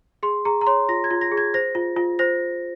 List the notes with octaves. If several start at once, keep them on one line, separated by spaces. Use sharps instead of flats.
G#4 C6
G#4 A#5
A#5
C#5 C6
F4 A#6
G#6
F4
A#6
G#4
G#6
C5 A#6
F4
F4
C5 A#6